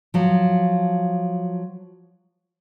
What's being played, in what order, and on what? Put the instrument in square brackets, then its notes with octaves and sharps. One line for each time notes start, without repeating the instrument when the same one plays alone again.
[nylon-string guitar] F3 F#3